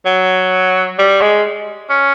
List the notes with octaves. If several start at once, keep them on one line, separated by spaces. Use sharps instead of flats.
F#3
G3
G#3
C#4